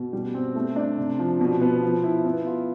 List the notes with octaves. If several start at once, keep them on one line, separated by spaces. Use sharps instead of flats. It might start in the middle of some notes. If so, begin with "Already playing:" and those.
Already playing: B2
G3
C4
A3
D4
C3
F3
B2
B3
F3
E4
B3
F4